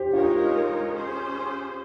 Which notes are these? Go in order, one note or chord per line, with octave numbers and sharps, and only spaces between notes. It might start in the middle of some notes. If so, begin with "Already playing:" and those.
Already playing: G4 C5
G#3 D#4 F4 A#4 C#5
C#4 G#4 C5